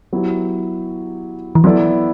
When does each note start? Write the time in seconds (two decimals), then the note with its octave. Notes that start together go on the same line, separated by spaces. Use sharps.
0.13 F#3 B3 E4 G4
1.55 E3
1.64 F#3 B3 E4 A4 D5